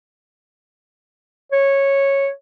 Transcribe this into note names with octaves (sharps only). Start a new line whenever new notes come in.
C#5